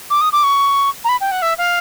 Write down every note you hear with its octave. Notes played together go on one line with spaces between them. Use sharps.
D6
D#6
D6
C#6
A#5
B5
G5
F#5
E5
F5